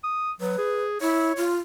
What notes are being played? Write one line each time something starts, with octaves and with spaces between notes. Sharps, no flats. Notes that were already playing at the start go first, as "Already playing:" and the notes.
D#6
F#3 B4
G#4
E4 C#5
F4